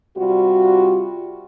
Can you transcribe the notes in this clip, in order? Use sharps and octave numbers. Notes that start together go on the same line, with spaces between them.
C3 G3 F4 F#4